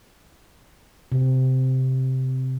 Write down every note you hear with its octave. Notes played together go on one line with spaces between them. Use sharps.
C3